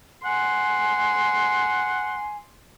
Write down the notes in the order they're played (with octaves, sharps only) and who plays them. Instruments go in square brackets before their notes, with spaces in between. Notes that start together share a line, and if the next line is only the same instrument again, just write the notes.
[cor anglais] F#5 [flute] G#5 [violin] C6